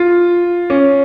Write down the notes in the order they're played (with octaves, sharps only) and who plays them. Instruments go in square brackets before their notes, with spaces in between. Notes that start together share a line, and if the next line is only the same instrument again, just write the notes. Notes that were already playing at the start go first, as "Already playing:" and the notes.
Already playing: [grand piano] F4
C#4